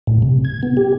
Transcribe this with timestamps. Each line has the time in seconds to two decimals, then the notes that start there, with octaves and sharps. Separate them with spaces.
0.07 A2
0.22 C3
0.45 G#6
0.63 B3
0.77 G4